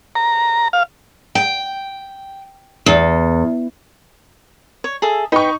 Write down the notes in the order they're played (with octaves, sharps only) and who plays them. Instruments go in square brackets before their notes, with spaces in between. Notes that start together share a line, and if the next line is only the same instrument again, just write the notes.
[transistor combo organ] A#5
F5
[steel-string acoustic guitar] G5
E2
[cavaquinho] C#5
G#4 A4 E5
[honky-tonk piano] D#4 C#6 [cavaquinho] B4 G5 B5